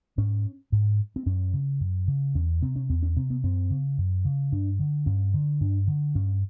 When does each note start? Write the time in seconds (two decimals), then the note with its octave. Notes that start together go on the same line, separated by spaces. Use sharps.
0.18 G#2 C#4
0.72 G#2
1.16 C4
1.26 F#2 C#4
1.54 C#3
1.81 F#2
2.08 C#3
2.35 E2 C#4
2.62 C3 C4
2.76 C#4
2.89 E2 C4
3.03 C#4
3.17 C3 C4
3.30 B3
3.43 F#2 C4
3.70 C#3
3.98 F#2
4.25 C#3
4.52 G2 D4
4.79 D3
5.06 G2 C#4
5.34 D3
5.61 G2 D4
5.87 D3
6.15 G2 C#4